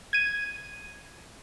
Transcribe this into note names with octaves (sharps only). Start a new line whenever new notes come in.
G#6 D#7